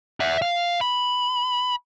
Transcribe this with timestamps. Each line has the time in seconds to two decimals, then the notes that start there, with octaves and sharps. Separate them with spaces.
0.20 E5 F#5
0.42 F5
0.81 B5